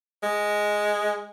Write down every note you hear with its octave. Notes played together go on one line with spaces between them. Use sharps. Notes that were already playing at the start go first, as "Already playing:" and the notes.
G#3